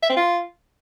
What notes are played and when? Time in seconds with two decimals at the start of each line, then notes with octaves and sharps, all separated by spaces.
0.03 E5
0.09 C4
0.16 F4